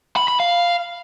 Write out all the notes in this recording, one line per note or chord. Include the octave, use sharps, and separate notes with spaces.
B5
B5
F5